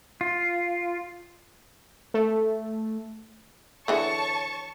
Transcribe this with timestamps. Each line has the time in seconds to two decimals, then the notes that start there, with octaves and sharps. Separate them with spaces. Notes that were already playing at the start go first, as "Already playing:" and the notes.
0.21 F4
2.14 A3
3.88 D3 E3 G#4 C#5 A5 C#6